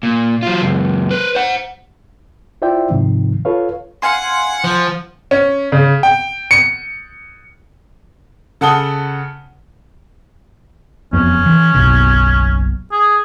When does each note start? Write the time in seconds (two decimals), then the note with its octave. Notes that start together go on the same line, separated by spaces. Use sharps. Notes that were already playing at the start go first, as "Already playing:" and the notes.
0.03 A#2
0.43 F#3 F4
0.61 C#2 F#2
1.11 B4 C5
1.35 C5 F#5
2.62 E4 F4 C5 D5 E5 G5
2.90 G#2 C3 D#3 F3
3.45 F4 A4 B4 C#5 F5
4.02 F5 F#5 G#5 C6
4.64 F3
5.31 C#4
5.72 C#3
6.03 G5
6.51 C#7
8.61 C#3 A4 F#5 A5 D#6 G7
11.13 E1 F2 B3 C#4
11.46 E3
11.74 F#1 B1 B2
12.92 G#4